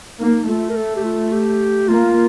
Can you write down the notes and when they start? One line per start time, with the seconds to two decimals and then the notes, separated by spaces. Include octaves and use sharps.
0.20 A#3 D#4
0.48 A3 F4
0.69 A#4
0.76 A4
0.96 G4
1.04 F4
1.32 G4
1.88 A#3 F4